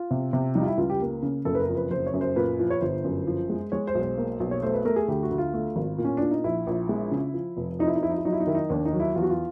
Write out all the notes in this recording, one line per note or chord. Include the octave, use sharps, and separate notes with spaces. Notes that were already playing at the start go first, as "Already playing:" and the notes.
Already playing: F4
C3
C3
G3 D#4
F4
E4
C#2 F4
G4
A#3
C#3
F#1 A4
B4
A#4
F2
B4
F#1 C5
C#5
F#2
C5
A#2 B4
F3
C#5
G1 C5
F#2
F3
G#3
G#3 C#5
C5
B1
C5
A#3
B1
C#5
A3 C5
B4
A3 A#4
G#4
D2 G4
F#4
D2
F4
A3
G#1
A#2
C#4
A#2 D4
D#4
A#1 E4
A#1
G#3
C#3
F3
F1
F2 D#4
E4
D#4
F3 E4
D#4
E4
F#3 D#4
E4
D#4
D#3 E4
D#4
D#2 D4
D#4
F#3
E4
E2 F4
F#4
F4